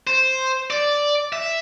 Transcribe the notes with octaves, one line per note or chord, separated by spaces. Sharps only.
C5
D5
E5